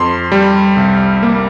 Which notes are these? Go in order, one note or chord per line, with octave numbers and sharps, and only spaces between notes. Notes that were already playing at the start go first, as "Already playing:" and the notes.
Already playing: F2 C6
G3
C2
A#3